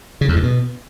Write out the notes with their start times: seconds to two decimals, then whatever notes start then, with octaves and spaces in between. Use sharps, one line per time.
0.21 C#3
0.29 E2
0.36 G2
0.43 B2